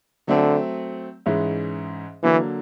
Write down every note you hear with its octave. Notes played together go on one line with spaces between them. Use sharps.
D3 F#3 A3 C4
G#2 E3 G#3 C#4 E4
D3 E3 F#3 A#3